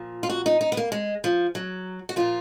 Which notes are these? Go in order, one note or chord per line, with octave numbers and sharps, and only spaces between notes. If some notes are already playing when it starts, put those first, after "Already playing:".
Already playing: A#2 F3
F4
F#4
D#4
D#4
B3
A#3
G#3
F3
F#3
F#4
A#2 F3 F4